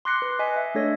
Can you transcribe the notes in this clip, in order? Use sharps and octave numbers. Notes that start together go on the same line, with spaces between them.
C6 D6 F#6 A#6 C7 C#7
B4
D#5 G#5 B6
E5
A3 D4 A4 C#5 A#6